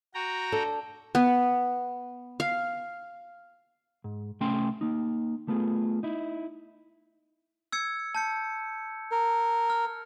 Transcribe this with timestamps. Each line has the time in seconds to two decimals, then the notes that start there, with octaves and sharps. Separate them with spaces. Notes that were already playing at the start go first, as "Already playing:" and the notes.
0.14 F#4 G5 A#5
0.52 D4 A4
1.15 B3
2.40 F5
4.04 G#2
4.40 C2 A3 C#4 G5 C6
4.81 A#3 D#4
5.48 A3 B3 F4 G#4
6.03 D#4 E4
7.72 E6 G#6 C#7
8.15 A5 G6 C#7
9.12 A#4
9.70 F6